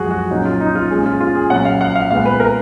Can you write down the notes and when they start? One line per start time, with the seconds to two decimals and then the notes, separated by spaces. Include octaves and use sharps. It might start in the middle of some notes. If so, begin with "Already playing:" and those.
Already playing: F#2 F3 G#3 F#4 G#4
0.11 F#4
0.31 A#2 F#3 C#4 D#4
0.45 F4
0.60 D#4
0.75 F4
0.90 A#2 G#3 C#4 G#4
1.06 F4
1.21 F4
1.35 G#4
1.50 A#2 F#3 C#4 F#5
1.65 F5
1.81 F#5
1.96 F5
2.11 A#2 G#3 B3 F5
2.26 B4
2.40 A#4